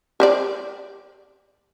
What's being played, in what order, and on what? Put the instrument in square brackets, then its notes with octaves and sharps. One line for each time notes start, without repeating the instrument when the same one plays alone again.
[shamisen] G4 C5 D5